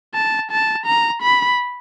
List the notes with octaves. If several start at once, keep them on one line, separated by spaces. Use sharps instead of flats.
A5
A5
A#5
B5